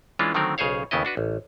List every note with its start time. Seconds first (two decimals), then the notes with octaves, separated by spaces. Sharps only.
0.19 E3 G#3 C#4 D4 F4
0.34 D3 D#3 F#3 A3 C4 A#4
0.58 B1 C#3 G#4 C5 C#5 F5
0.91 D#2 C#3 B3 E4 D#5
1.05 D4 F#4 B4
1.17 A1